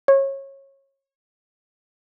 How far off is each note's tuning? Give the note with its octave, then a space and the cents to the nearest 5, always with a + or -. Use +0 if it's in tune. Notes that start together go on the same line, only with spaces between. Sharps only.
C#5 -25